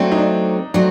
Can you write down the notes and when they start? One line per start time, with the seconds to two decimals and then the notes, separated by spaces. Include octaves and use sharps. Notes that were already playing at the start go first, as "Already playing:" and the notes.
Already playing: F#3 A3 C4 D4
0.12 D#4
0.17 D4
0.74 F#3 A3 C4 D4